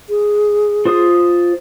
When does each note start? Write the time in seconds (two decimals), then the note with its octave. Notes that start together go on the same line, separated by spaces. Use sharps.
0.09 G#4
0.85 F4 C5 D#6